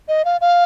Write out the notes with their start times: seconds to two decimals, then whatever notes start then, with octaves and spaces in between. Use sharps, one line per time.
0.08 D#5
0.25 F5
0.41 F5